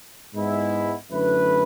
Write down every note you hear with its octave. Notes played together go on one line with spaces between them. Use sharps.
G#2 G#3 B3 E4
F#2 D3 A3 E4 B4